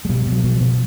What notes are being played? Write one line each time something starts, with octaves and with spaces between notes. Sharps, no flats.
G#3
B2 G3
B2 G3
F#3
B2 F#3
F3
B2